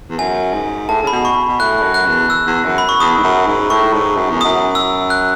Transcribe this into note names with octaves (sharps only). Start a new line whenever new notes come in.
E2
F#2 G#5
G#2
A2 A5
C#3 B5
B2
C#6
B2
A2 F#6
F#2
F#6
E2
E6
E2
F#2
B5
C#6
E2 D#6
G#2
F#2
G#2
A2 C#6
G#2
F#2
E2
F#2 D#6
E6
F#6